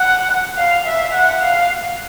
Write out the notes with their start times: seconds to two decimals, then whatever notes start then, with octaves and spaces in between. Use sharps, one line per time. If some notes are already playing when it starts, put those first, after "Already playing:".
Already playing: F#5
0.57 F5
0.85 E5
1.13 F#5
1.41 F5